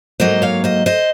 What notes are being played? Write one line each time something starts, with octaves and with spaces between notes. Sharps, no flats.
G#2 F#3 A#3 C5 D#5
C#5 F5
C5 D#5
C5 D#5